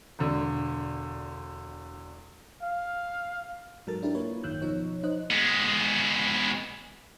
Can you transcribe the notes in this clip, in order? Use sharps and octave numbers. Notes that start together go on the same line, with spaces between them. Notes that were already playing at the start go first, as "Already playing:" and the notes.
E1 D3
F5
G#2 F#3 A4 A#4 A6
D4 E4 G4 A#4
A#3 E4 F4 B4 C#5
G#1 F#2 D#3 E6 F#6 G6
B1 B2 F3 D#4 C#5
F3 D#4 C5 D#5 F#6
G#3 B3